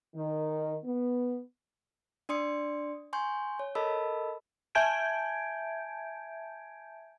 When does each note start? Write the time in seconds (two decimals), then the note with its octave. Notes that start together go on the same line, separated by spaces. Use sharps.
0.15 D#3
0.84 B3
2.29 D4 D5 C6 D#6 C#7
3.13 G#5 C6 C#6 G6
3.59 C#5
3.75 A4 A#4 D#5 A5 B5 E6
4.75 E5 G#5 A5 G6 G#6 D7